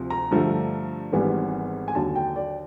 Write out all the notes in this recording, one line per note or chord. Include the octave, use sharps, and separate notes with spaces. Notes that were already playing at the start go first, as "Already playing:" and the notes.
Already playing: D2 C3 F3
A#5
G2 D3 F3 A3
G#1 G#2 E3 G3 B3
G#5
D#2 D3 F#3 A5
G5
D5